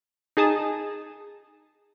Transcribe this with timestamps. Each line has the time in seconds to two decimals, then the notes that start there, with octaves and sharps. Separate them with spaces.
0.37 D#4 G#4 A5 D#6